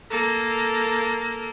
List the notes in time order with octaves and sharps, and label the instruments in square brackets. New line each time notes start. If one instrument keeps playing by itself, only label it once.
[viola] A#3 A4